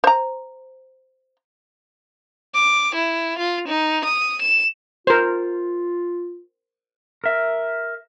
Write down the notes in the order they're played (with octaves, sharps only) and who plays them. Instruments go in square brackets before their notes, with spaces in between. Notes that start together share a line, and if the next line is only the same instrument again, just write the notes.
[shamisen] C5 A#5
[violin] D6
E4
F4
D#4
D#6
E7
[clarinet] F4 [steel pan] A#4 C5
[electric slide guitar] A#4 E5